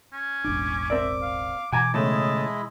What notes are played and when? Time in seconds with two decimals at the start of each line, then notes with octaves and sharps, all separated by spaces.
0.13 C#4
0.44 E1 A1 D4 D6
0.90 C4 A#4 D5 E5
1.22 F5
1.72 B2 E3 G5 G#5 A#5 D6
1.94 A2 C#3 G#3 A3 E4 D#5 A5